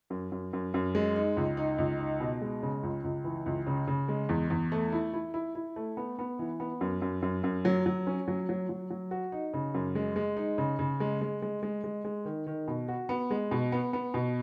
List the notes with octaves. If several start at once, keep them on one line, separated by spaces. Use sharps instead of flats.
F#2
F#2
F#2
F#2
G#3
D#4
C#2
D#4
C#2
D#4
B2
G#3
C#3
C#2
C#2
E3
C#2
C#3
C#3
G#3
E2
E2
A3
E4
E4
E4
E4
A3
B3
B3
E3
B3
F#2
F#2
F#2
F#2
F#3
F#3
C#4
F#3
F#3
F#3
F#3
F#4
D#4
C#3
F#2
G#3
G#3
D#4
C#3
C#3
G#3
G#3
G#3
G#3
G#3
G#3
D#3
D#3
B2
F#4
B3
G#3
B2
B3
B3
B2